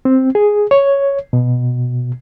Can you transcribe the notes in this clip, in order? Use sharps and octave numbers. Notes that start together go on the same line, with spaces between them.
C4
G#4
C#5
B2